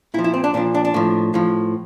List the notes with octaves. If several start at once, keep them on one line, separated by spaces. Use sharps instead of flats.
A#2 F3 E4
E4
C4
D4
A#2 F3 D4
D4
D4
A2 F3
A2 F3